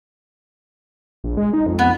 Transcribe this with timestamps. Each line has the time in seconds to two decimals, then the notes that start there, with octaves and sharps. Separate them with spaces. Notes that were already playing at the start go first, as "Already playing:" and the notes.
1.24 A#1
1.37 G#3
1.53 D#4
1.67 F2
1.79 B3